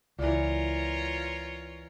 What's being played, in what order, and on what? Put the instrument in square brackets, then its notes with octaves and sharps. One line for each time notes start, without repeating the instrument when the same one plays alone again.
[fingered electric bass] C#2 [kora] A#2 E3 [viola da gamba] F4 A#4 C#5